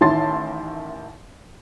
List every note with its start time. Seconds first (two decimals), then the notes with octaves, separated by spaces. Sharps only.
0.01 A1 D#3 E4 A5 C6 A6